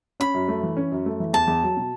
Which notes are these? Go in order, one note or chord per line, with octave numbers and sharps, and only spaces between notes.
C#4 B5
F#2
A3
E3
C#4
F#2
A3
E3
E2 A5
E2
F#3
B2